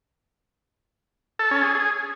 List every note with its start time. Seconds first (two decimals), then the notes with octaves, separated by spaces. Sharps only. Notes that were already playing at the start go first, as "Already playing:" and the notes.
1.39 A4
1.51 C#4
1.63 G#4
1.75 G#4